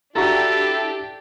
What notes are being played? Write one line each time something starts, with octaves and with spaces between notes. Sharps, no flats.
D4 E4 F#4 G4 A4 A#5